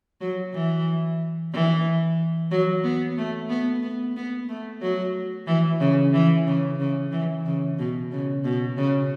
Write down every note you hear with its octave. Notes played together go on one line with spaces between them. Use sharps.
F#3
E3
E3
F#3
B3
A3
B3
B3
B3
A3
F#3
E3
C#3
E3
C#3
C#3
E3
C#3
B2
C#3
B2
C#3